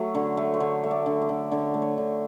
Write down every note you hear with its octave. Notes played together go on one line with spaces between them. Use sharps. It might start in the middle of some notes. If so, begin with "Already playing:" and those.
Already playing: F#3 A3
D3 C#5
A3
C5
D3 C#5
A3
D5
D3
D5
D3
D3 C#5
A3
C#5
D3